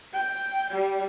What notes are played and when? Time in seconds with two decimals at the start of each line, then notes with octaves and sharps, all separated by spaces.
0.14 G5
0.71 G3